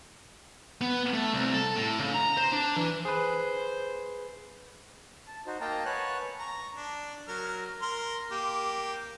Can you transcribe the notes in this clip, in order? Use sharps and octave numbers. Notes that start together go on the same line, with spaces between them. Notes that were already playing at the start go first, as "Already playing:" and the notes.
B3
A3
C2
A4
A2
C#3
A#5
C5
D4
E3
G#4 B4 C5
A5
D#4 F#4 C5
A#3 D#5 F5 G5 A5 A#5
B4 C#5 F#5 G#5 A5 F#6
A#5 C#6
D4
F#3 A#4 F6
A#4 C6 F6
A#3 G4